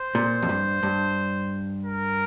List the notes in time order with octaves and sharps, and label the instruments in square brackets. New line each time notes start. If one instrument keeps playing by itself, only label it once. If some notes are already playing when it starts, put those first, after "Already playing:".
Already playing: [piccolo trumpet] C5
[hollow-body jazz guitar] A#2
F2
G2
G2
[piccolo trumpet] A#4